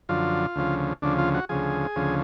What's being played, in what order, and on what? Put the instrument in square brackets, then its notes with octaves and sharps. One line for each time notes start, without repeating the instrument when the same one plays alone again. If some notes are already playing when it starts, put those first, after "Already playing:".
[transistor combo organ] F#2 D3 F3 F4
D2 C#3 F3
D2 C#3 F3 D4
F4
F#4
D2 C#3 F3 G#4
D2 C#3 F3